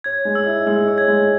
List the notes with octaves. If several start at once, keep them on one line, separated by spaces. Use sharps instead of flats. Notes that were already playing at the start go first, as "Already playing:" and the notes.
C#5 G#6
G#3
E6
E4
G#3 E6
C#5
G#6
G#3